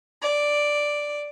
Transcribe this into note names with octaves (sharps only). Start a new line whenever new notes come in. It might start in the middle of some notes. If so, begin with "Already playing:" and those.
D5